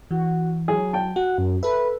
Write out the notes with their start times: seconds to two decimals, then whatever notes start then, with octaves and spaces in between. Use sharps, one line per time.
0.11 E3 F#4
0.68 F#3 G#4
0.93 G5 A5
1.16 F#4 F#5
1.38 F#2
1.63 A4 B4 E5